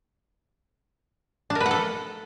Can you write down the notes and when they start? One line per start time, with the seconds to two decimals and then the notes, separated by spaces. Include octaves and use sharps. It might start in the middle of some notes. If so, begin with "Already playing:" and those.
1.50 D4
1.55 A#4
1.60 B4
1.66 F#5
1.71 A4